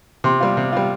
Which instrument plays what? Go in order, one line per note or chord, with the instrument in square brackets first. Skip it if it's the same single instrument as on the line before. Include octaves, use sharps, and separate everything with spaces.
[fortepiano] C3 [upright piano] C6
[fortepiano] G3 F4
C3
G3 F4